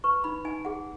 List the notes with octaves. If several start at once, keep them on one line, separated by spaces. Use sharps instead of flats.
B4 C#6
D#4 B5
D#4 G#5
G#4 F#5